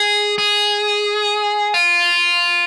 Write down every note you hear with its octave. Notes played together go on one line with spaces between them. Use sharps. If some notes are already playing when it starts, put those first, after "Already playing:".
Already playing: G#4
G#4
F4